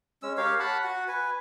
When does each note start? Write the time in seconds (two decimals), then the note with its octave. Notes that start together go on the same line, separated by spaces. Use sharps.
0.23 G#3 C#4 E6
0.37 G4 A#4 C#5 F5
0.59 F#5 A5 B5
0.84 F#4 F#5
1.08 B4 G#5